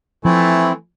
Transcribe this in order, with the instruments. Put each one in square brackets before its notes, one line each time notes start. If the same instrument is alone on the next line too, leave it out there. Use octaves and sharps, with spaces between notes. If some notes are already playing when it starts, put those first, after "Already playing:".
[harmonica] E3 A3 G#5 [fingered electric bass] F3 [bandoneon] C4 E4